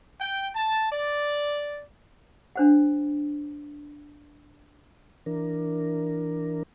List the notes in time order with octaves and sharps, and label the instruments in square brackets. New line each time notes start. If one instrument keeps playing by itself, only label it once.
[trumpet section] G5
A5
D5
[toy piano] D4 C5 F#5
[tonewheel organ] E3 D4 A#4